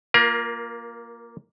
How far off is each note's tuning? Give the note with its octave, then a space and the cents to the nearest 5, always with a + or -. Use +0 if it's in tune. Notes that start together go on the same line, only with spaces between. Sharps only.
A#3 +0 F4 +0 A#4 +30